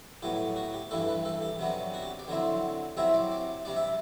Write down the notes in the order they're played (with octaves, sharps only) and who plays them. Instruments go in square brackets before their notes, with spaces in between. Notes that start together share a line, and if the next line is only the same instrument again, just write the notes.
[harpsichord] A2 F#3 B3 G4
F#4
G4
G2 E3 G3 A4
B4
A4
G4
C3 F#3 B3 D4
F#4
G4
D5
D3 F#3 C4 E4
C3 F#3 C4 E4 E5
D5
D5
C3 G3 D4 D5
E5